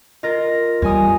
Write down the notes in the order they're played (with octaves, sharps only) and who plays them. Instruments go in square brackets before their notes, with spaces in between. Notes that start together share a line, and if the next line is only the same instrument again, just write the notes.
[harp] F4 A#4 [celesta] D#5 A#6
[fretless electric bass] E2 G3 [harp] C#5 G#5 D#6